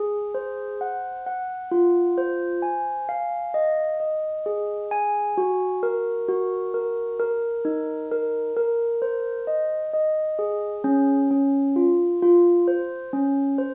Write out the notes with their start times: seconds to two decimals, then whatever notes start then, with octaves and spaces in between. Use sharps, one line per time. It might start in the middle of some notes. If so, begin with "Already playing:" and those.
Already playing: G#4
0.35 C5
0.81 F#5
1.26 F#5
1.71 F4
2.18 C5
2.62 G#5
3.09 F5
3.54 D#5
4.00 D#5
4.46 G#4
4.91 G#5
5.38 F#4
5.83 A#4
6.28 F#4
6.74 A#4
7.20 A#4
7.65 D#4
8.11 A#4
8.57 A#4
9.02 C5
9.47 D#5
9.94 D#5
10.39 G#4
10.84 C#4
11.31 C#4
11.76 F4
12.22 F4
12.68 C5
13.13 C#4
13.58 C5